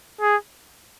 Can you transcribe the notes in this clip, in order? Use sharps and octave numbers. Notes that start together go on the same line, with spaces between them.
G#4